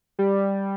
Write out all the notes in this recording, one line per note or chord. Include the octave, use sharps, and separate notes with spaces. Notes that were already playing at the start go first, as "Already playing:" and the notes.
G3